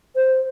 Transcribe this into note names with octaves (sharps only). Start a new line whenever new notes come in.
C5